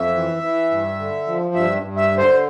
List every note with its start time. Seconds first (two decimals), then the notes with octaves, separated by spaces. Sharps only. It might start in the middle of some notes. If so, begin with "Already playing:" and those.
Already playing: F2 E5
0.15 E3
0.43 E3
0.71 G2
0.99 D3
1.27 F3
1.55 G2 E5
1.83 G2
1.96 E5
2.11 D3
2.18 C5